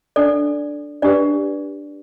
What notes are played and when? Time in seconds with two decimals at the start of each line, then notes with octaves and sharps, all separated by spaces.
0.16 D4 A4 D5
1.02 D4 G4 B4 D5